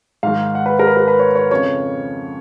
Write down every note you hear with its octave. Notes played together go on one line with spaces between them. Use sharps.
G#2 D#3 F5
F#5
B4
A#4
B4
A#4
B4
C#5
C#5
F2 C#3 C#5